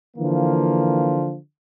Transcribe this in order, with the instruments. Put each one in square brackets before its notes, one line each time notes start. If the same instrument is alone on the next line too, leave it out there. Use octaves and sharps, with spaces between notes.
[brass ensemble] D3 E3 F3 A#3